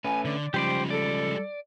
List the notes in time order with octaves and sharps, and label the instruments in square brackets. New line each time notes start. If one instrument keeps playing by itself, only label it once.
[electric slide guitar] A3 C#4 B4 [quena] G#5
[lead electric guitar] D3 [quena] D5
[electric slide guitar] C#3 F3 [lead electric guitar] G3 G#3 [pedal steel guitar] G4 C5 D6
[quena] A4 [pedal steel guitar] D5